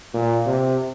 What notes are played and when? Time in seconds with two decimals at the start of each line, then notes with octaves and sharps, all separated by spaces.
0.14 A#2
0.46 C3